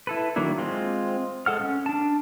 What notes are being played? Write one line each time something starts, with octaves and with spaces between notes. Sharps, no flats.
E4 A4 B4
D#3 F#3 A#3 D4 E4
G#3 C4 F4
G#3 A4 F#5 F6
C#4
D4 A5